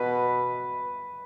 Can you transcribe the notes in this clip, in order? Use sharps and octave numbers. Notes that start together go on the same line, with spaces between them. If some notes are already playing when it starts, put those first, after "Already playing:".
Already playing: B2 B4